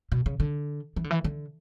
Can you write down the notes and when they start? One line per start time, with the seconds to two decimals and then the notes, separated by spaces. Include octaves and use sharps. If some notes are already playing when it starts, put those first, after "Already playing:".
0.12 B2
0.26 C#3
0.40 D3
0.96 E3
1.04 D3
1.11 E3
1.24 D3